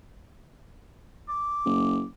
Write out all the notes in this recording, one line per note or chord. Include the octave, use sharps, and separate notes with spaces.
D6
F#1